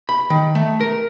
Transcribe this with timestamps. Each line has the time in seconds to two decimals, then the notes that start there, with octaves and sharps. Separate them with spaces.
0.09 B5
0.30 D#3
0.55 A3
0.80 A#4